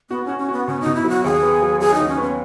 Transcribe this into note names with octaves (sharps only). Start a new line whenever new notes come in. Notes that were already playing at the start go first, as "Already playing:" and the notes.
B3 F#4
C#4 F#4
C#4
B3 F#4
B2 C#4
D#4
B2
E4
F#3
F#4
D#2 G#4
B3
F#3
F#3 G#4
D#2 D#4
C#4
B3
C#4